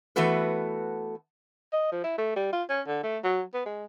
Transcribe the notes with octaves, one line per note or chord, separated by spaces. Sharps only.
E3 A3 B3 F#4 A4 B4
D#5
F3
E4
A3
G3
F4
C#4
D3
A3
F#3
B3
G#3